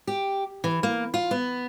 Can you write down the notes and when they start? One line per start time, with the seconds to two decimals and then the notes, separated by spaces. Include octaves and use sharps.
0.07 G4
0.64 E3
0.83 A#3
1.14 F4
1.31 B3